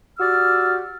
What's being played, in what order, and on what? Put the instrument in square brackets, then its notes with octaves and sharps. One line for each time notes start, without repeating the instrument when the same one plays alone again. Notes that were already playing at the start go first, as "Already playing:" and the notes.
[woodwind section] F#4 G4 D5 E6 F6